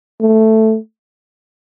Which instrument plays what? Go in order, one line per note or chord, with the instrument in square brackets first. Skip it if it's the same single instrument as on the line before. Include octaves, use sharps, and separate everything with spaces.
[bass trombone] A3